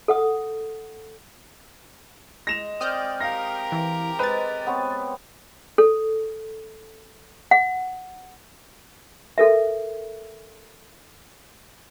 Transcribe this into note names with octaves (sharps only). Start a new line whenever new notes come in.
A4 F#5 D#6
G#3 A#6 E7 F7
C4 D5 D#6 F6 G6
G4 A#4 F5 A#6
E3
G#3 B4 C5 A6
B3 C4 C#5
A4
F#5
A4 A#4 E5